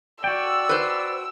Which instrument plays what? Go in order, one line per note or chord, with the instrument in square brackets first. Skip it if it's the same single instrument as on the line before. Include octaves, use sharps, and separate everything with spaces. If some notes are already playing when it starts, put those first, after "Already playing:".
[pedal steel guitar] F#4 G5 [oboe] D5 [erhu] E6
[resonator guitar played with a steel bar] B4 C5